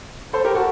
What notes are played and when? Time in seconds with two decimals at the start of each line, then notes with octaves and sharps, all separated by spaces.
0.33 A4 C5
0.45 G4 A#4
0.55 F#4 A4